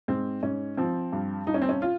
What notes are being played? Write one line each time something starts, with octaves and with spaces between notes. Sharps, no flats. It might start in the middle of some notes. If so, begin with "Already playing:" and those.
G#2 C4
G#2 C#4
F3 C4
G2
G2 D#4
C#4
C4
C#4
F4